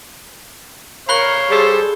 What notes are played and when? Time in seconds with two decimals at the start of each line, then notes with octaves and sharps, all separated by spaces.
1.09 A#4 C#5 F5 B5 F#6 G7
1.50 G3 G#4 A4 C5